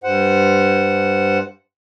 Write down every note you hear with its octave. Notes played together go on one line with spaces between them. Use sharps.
G2 C5 F#5